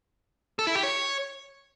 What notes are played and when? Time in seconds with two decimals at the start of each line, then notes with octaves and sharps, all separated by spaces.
0.59 A4
0.67 E4
0.75 G4
0.83 C#5